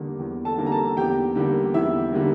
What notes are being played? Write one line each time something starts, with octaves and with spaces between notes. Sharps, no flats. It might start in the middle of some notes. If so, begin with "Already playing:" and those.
Already playing: E2 D3 G3 A#3
E2
A4 A5
D3 G3 A#3
A#5
A4 A5
E2 G4 G5
D3 G3 A#3
E2 E4 E5
D3 G3 A#3